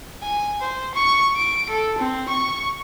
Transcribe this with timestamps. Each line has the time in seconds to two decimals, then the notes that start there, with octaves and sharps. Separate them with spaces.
0.22 G#5
0.61 C5
0.94 C#6
1.36 D7
1.69 A4
1.98 C4
2.29 C#6